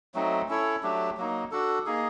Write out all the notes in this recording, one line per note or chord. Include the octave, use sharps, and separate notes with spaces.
F#3 A3 C4 D#4
C#4 E4 A4 C#5
F#3 A3 D4 G4
F#3 A#3 D#4
D4 F#4 A4
A#3 D#4 G#4